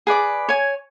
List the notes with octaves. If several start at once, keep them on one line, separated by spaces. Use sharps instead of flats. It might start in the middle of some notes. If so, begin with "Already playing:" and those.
G#4 B4 D5 D6
C#5 G#5